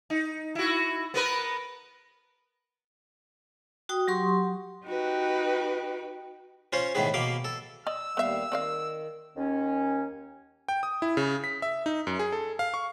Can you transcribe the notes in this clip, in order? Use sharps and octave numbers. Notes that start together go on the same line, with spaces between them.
D#4
E4 F#4
B3 A#4 B4
F#4 G5 D#6
F#3 G4 C6 C#6
D#4 F#4 G4 B4
C#4 F4 C5 C#5
A2 D#3 B3 G#4
B2 A#3 F5 D6
A4
D5 D#5 E6
D#2 G3 B3 E5 F5
D#3 C4 D5 F5
D#2 D#3 C#4
G5
D#6
E4
C#3
B6
E5
D#4
F#2
G#4
A4
F5
C#6